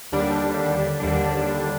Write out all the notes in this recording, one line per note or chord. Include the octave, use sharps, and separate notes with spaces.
D#2 D3 G3 D4
D#2 D3 G3 D4